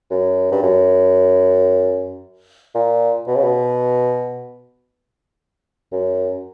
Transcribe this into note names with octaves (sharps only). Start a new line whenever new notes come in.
F#2
G2
F#2
A#2
B2
C#3
B2
F#2